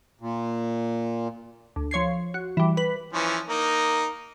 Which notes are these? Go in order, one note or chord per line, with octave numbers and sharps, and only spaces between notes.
A#2
D2
F3 C#5 G#6 C7
F#4
E3 G3
B4
E3 F3 C#4
A#3 D#4